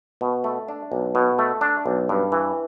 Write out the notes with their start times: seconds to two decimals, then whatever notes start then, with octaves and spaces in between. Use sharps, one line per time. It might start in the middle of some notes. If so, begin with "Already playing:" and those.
0.21 B2
0.44 A3
0.68 D4
0.92 B1
1.15 B2
1.39 A3
1.61 D4
1.86 B1
2.09 G2
2.32 E3